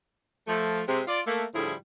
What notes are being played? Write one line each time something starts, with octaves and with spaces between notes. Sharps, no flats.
F3 A3
C3 G#3
F4 D5
A3 A#3
A2 D3 F3 G3 E4 G#4